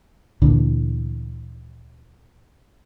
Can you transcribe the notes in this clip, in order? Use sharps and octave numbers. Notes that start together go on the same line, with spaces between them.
D2 A#2 D3 E3